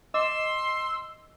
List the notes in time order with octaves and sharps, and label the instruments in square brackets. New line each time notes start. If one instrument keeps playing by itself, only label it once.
[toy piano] D#5 D6 [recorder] C6 [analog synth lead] E6